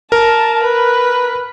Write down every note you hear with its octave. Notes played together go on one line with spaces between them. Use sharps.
A#4 A5
B4